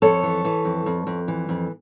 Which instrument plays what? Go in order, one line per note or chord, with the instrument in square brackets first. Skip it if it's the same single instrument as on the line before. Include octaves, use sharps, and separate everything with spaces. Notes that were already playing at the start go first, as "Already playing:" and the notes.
[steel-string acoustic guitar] F2 A4 C#5
E3
E3
F2
F2
F2
E3
F2